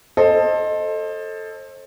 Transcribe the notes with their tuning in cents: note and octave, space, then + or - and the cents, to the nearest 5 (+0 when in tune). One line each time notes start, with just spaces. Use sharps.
A4 +5 C5 +30 D#5 +0